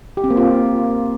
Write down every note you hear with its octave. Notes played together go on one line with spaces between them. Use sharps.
G4
C4
A#3
F4